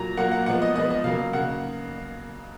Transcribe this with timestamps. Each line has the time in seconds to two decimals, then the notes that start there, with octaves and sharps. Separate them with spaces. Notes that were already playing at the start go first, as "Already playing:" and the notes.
Already playing: A#2 F#3 A#5
0.17 A#2 F#3 A#3 F#5
0.32 F#5
0.46 A#2 F3 G#3 B3 F#5
0.62 D#5
0.75 A#2 F3 G#3 B3 D#5
0.90 D#5
1.04 C#3 F#3 A#3 F5
1.33 C#3 F#3 A#3 F#5